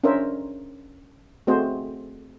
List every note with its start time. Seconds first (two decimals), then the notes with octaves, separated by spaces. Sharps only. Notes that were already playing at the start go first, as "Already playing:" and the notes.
0.04 C#4 D4 A#4 C5 C#5 E5
1.47 A3 C4 F#4 G#4 C5 D#5